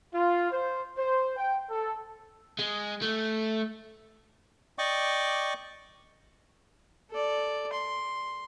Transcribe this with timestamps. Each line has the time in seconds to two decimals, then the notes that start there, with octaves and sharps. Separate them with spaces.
0.14 F4
0.52 C5
0.98 C5
1.37 G5
1.70 A4
2.59 G#3
3.01 A3
4.78 D5 D#5 G5 C#6 D6
7.11 A4 D5
7.73 C6